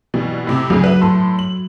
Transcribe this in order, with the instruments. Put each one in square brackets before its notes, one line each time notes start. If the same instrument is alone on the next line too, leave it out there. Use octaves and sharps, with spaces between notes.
[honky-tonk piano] B2 E3 G3
A2 C3
[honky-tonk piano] D2 C#3 G#4 [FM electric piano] F#3
[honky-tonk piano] B4 E5
A2 A4 C6
F#7